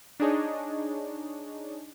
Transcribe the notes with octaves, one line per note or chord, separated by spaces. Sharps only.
D4 D#4 G#4 C#5 D#5